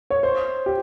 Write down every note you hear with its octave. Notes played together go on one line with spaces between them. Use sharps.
C#5
C5
G4